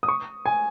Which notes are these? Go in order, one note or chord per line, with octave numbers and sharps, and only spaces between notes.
D#6
C#6
G#5